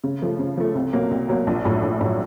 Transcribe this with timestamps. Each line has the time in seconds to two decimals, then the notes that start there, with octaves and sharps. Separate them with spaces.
0.04 C#3
0.22 F3 A3
0.39 C#3
0.57 F3 A3
0.75 C2
0.93 B2 F#3 A#3
1.11 C2
1.29 B2 F#3 A#3
1.47 A#1
1.65 A2 F#3
1.83 A#1
2.01 A2 F#3